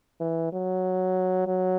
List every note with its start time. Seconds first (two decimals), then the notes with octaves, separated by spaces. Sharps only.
0.20 E3
0.53 F#3
1.47 F#3